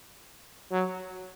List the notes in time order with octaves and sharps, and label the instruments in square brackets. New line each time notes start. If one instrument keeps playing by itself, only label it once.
[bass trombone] F#3